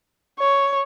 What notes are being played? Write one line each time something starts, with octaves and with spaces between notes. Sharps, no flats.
C#5